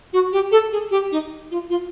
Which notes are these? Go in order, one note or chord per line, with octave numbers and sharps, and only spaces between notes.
F#4
G4
A4
G#4
G4
D#4
F4
F4